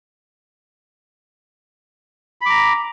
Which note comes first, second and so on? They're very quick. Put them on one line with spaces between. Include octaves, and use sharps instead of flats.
B5 D6 A#5